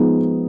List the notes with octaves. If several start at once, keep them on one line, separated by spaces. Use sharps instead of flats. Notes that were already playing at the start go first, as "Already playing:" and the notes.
Already playing: F3 G#3 B3 D#4